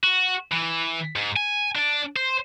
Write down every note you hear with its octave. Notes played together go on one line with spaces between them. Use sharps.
F#4
E3
G#2
G#5
D4 D5
C5